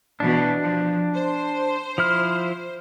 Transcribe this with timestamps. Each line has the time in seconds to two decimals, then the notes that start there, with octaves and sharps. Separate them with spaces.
0.20 B2 E3 D4
0.61 F3
1.14 C5
1.98 F3 E4 F6